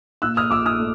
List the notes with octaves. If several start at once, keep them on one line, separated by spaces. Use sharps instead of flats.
A#2 E6 F#6
D#6 F6
A#1 D6 E6
D#6 F6
A3